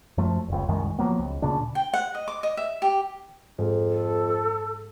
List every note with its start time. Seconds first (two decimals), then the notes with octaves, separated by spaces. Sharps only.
0.18 F#2 F3 A3
0.48 F1 C#2
0.68 C2 F#2 D#3 G#3
0.99 F3 F#3 A#3 B3
1.19 C#2
1.42 D2 A#2 C#3 D4
1.75 G5
1.94 F#5
2.15 D#5
2.28 D6
2.43 D#5
2.57 E5
2.82 G4
3.59 F2 G#2
3.89 A4